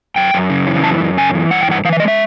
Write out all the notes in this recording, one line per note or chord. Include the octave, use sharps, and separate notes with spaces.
F#2 G5
F#2
C#3
E3
F#2 A5
F#2
C#3 G#5
E3
G2 F#5
G5
G2 F#5
E3 F5
E5
G#3 D#5
E5